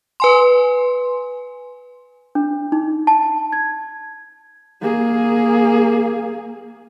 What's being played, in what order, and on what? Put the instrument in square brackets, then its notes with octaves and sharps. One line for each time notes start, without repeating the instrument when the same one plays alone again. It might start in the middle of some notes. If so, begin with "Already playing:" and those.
[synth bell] B4 G#5 C6
[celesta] D4
D#4
A5
G#6
[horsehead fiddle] A#3 G#4